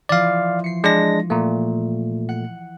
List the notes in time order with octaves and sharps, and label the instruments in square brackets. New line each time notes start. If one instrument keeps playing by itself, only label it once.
[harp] E3 F3 [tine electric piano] D5 F5
[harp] C7 C#7
[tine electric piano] G#3 D4 A#6
A#2 A3
[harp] F#5